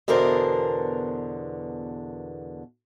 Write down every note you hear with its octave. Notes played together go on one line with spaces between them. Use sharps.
E2 B2 D3 A#4 C5